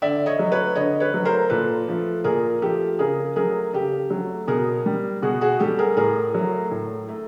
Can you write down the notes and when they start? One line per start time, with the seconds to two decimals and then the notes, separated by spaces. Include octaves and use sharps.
0.02 D3 D5 E5
0.26 C#5 D#5
0.38 F#3 A3
0.52 B4 C#5
0.75 D3 C#5 D#5
1.00 B4 C#5
1.14 F#3 A3
1.25 A#4 C5
1.50 A#2 A4 B4
1.88 F3 A3
2.24 A#2 G#4 A#4
2.62 F3 A3 G4 A4
2.99 C#3 G#4 A#4
3.36 F#3 A3 G#4 A#4
3.73 C#3 G4 A4
4.10 F#3 A3
4.48 B2 G#4 A#4
4.86 G3
5.22 B2 F#4 G#4
5.41 F#4 G#4
5.59 G3 G4 A4
5.78 G#4 A#4
5.96 A2 G#4 A#4
6.34 F#3 A3
6.71 A2
7.09 A3